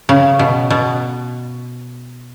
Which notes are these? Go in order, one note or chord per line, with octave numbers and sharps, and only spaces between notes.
C#3
B2
B2